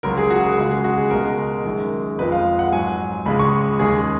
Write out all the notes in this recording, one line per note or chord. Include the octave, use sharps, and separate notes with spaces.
C#2 C#3 F#3 A#4
G#4
F#4
G#4
C#2 C#3 G#3
G#4
F#4
G#4
C#2 B2 G#3 A#4
F#2 D#3 G#3
F2 F3 G#3 B4
F5
F#5
G#2 F#3 G#5
C#2 C#3 G#3 B5
C#6
D#2 C#3 G#3 G#4